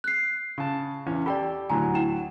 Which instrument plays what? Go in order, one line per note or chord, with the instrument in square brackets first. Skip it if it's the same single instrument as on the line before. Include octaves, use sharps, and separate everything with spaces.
[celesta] F#6 C7
[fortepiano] C#3 A5
E2 C#4
[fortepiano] G4 A4 [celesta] D5 G5 B5
[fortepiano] D2 A2 F#3 [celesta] G#5 A#5
[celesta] E4 G5 E7